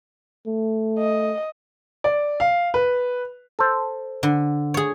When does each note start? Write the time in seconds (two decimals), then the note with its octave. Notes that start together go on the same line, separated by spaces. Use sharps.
0.47 A3
0.99 D#5
2.04 D5
2.40 F5
2.74 B4
3.59 A4 C5
4.23 D3
4.74 G#4 C#5